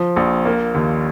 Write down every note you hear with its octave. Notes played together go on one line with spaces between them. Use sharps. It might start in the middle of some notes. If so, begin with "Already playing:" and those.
Already playing: F3
A#1
A#3
D#2